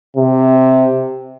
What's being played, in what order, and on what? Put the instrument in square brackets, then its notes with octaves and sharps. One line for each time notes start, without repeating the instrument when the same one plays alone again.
[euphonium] C3